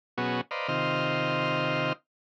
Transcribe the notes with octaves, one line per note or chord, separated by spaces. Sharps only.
B2 F#3 B3 C#4 F#4 G#4
B4 C5 D5 D#5 F5 A#5
C3 D#3 F4 C5 D#5 F6